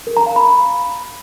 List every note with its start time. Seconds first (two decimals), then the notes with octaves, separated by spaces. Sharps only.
0.07 A#4
0.17 A#5
0.26 F5
0.36 B5